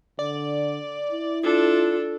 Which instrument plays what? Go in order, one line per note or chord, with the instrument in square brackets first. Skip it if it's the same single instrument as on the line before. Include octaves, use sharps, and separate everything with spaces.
[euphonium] D3 [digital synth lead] D5
[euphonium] E4
[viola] D4 A4 [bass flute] F4